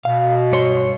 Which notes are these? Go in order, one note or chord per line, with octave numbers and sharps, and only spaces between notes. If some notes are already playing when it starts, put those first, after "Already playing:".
B2 F5
G2 C#5 C6